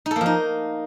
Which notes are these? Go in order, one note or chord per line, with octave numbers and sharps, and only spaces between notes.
D#4
A4
A#3
F3
D#4